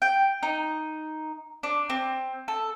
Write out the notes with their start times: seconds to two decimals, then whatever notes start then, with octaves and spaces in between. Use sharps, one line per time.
0.02 G5
0.43 D#4
1.63 D4
1.90 C4
2.48 A4